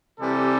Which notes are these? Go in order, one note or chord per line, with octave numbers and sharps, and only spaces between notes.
C3 E3 G3 A4